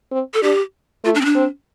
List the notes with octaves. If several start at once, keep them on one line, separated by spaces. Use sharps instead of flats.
C4
A4
D4 G4
A3 F4
D4
C4
D4
C4